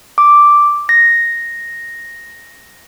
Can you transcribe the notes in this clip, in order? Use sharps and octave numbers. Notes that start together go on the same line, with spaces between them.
D6
A#6